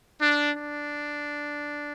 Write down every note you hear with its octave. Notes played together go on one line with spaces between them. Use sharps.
D4
D4